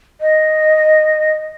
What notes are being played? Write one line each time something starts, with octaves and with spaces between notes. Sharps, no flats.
D#5